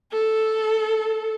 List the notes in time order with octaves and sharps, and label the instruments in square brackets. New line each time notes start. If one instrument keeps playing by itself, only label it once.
[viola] A4